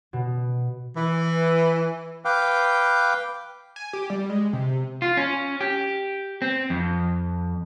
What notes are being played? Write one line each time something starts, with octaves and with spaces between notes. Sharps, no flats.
B2
E3
B4 F5 G5 D6
G#5
G4
G3
G#3
C3
F4
C#4
G4
C4
F2